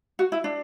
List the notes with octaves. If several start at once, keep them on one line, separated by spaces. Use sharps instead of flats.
F#4
E4
D4